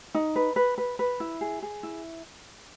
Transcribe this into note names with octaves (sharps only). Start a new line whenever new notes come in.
D#4
B4
B4
B4
B4
E4
G#4
G#4
E4